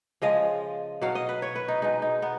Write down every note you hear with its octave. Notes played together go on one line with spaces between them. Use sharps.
C#3 F3 G#3 D#5
B2 F#3 F5
D#5
B4
C#5
B4
D#4
B2 G#3 D#4
D#4
B3